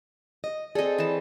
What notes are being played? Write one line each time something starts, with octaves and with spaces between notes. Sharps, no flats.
D#5
C4 G#4 A4 D5 D#5
E3 A5